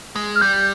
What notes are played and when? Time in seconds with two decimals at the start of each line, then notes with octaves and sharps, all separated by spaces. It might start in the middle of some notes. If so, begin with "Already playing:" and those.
0.16 G#3
0.35 F6
0.41 G3 G6